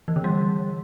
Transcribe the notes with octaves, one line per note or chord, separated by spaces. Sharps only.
E3
D3
G3